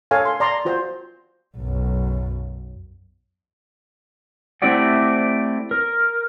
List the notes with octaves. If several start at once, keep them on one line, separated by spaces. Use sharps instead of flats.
A4 C#5 F5 G#5
C6
D5 A#5 C6
F4 F#4 C5
B1 F#2
A3 C4 E4 G4 D5 F#5
A#4